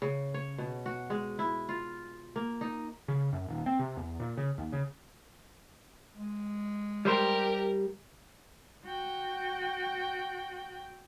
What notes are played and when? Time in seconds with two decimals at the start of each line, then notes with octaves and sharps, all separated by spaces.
0.02 C#3
0.34 C#5
0.58 B2
0.86 F#4
1.10 G#3
1.39 E4
1.69 F4
2.36 A#3
2.61 D#4
3.08 C#3
3.33 F#2
3.48 D#1
3.66 C4
3.79 C3
3.97 E2
4.20 A#2
4.37 C#3
4.58 D#2
4.72 C#3
6.16 G#3
7.05 G3 G4 A#4 C5 C6
8.85 F#4 G5